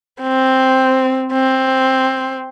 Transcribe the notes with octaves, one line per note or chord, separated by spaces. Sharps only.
C4
C4